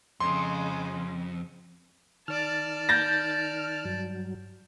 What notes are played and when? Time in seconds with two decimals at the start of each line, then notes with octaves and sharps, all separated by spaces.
0.20 F2 C#3 G#3 C6
2.28 D#3 D5 A5 F6
2.89 G6 A6 A#6
3.85 G2 F#3